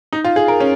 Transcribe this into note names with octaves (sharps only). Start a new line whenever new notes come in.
D#4
F4
G#4
A#4
C#4